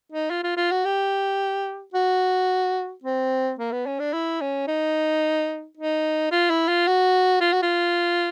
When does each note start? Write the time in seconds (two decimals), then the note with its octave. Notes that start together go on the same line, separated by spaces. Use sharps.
0.12 D#4
0.30 F4
0.43 F4
0.57 F4
0.71 F#4
0.85 G4
1.94 F#4
3.04 C4
3.59 A#3
3.72 B3
3.86 C#4
4.00 D4
4.13 E4
4.41 C#4
4.68 D#4
5.78 D#4
6.32 F4
6.50 E4
6.68 F4
6.87 F#4
7.41 F4
7.53 F#4
7.63 F4